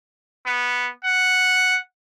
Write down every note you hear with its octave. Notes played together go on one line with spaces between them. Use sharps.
B3
F#5